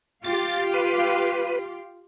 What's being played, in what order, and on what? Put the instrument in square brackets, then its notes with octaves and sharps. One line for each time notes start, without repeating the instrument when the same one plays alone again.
[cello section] F4 G4 F5 [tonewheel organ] A6
[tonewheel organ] B4